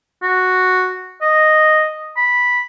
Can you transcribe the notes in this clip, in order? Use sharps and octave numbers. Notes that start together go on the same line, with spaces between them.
F#4
D#5
B5